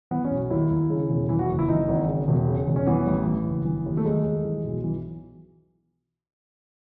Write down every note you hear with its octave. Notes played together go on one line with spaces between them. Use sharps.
E3 B3
C#4
B1
D#2 E4
D#2
C#3
E1
E3 E4
F#4
F#1
E4
E3 D#4
G#1
C#3
E1
C#3
E1
C#4
E3 B3
A1
E3
F#1
E3
D#2
A3
D#2 G#3
D#2
E3
B1
E3